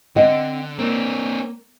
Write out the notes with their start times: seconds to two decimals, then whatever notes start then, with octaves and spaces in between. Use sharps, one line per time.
0.16 D3 C4 D#5 F#5
0.79 A#3 C4 D4